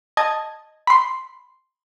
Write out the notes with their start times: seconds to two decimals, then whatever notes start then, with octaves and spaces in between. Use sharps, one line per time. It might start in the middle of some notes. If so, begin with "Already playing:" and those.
0.17 D#5 A5 G#6
0.87 B5 C6